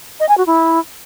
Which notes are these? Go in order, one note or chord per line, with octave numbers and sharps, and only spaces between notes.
D#5
G#5
F#4
E4